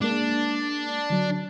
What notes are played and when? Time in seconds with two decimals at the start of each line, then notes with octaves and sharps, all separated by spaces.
0.02 G#3 A#3 D4
1.10 D3 F#3